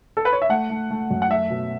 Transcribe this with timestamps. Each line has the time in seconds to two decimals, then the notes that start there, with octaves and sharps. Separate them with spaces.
0.17 A4
0.25 B4
0.33 C#5
0.42 E5
0.49 A3 F#5
0.70 A3
0.90 A3
1.11 F#2
1.22 F#5
1.30 A3 E5
1.50 B2